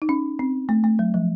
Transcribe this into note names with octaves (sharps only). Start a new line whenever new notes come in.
D#4
C#4
C4
A3
A3
F#3
F3